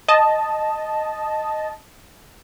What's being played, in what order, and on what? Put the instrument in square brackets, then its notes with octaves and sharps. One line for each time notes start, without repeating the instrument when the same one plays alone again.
[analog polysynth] D#5 A5